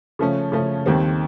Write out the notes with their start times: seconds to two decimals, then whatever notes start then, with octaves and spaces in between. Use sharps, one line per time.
0.19 C#3 F3 A3 C#4
0.52 C#3 F3 A3 C#4
0.86 D#2 D#3 G3 C4